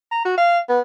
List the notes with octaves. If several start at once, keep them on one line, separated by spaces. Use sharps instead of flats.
A#5
F#4
F5
B3